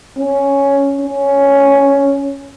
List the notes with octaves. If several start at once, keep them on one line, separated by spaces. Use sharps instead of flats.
C#4
C#4